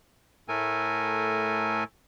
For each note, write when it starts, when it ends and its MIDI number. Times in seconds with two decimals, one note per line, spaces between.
0.48 1.84 45
0.48 1.84 57
0.48 1.84 69
0.48 1.84 70
0.48 1.84 80